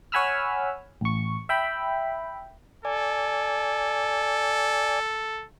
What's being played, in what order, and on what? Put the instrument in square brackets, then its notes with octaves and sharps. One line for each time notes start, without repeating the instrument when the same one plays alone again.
[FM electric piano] C#5 F#5 G#5 B5 E6 F6
A1 C#6
E5 G5 B5
[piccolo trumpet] A4 [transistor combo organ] D5 G#5